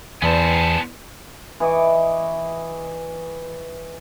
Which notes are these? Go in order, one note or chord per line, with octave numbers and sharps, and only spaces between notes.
E2 B3 C5 G#5 A5
E3 D#5 C#6 D6